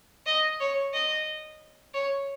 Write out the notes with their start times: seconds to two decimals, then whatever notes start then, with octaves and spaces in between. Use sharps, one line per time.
0.26 D#5
0.60 C#5
0.94 D#5
1.94 C#5